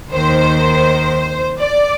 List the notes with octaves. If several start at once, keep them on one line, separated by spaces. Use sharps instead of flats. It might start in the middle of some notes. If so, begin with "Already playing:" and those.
D#2 D#3 C5
D5